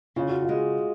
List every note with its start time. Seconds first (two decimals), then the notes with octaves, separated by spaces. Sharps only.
0.16 C#3 F4
0.29 F#4
0.42 F4
0.49 G#3